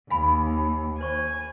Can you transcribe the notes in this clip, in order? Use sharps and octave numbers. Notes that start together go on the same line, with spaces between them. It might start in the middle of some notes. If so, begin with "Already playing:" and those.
D#2 F5 G#5 B5
C5 G#5 C#6